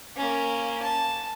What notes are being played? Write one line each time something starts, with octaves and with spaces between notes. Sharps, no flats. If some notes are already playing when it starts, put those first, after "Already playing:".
A#3 C#4
A5